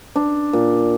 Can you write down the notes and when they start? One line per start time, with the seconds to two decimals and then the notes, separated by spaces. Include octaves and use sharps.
0.16 D4
0.53 A#2